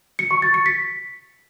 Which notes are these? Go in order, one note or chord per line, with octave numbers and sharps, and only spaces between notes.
C#7
C#6
A6
C#7
B6